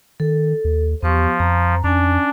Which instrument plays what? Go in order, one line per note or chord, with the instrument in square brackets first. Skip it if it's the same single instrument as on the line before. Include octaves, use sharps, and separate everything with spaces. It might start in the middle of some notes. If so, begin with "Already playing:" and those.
[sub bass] D#3 [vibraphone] A4
[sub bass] D#2
[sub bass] E2 [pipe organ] F3 [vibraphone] B3 G4 C#6
[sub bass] F2 [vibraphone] A#5
[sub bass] F2 [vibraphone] C#4 G#5 [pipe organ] D4